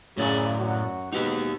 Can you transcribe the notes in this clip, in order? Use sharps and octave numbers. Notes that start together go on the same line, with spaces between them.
F#2 A2 C#3 D5
F#2 F#4
G#2 B2 D#4 G4